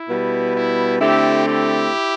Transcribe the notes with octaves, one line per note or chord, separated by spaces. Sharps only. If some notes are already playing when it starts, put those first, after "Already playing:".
Already playing: E4
B2 G3 B3
E4
D3 A3 C4 E4 G4
E4 G4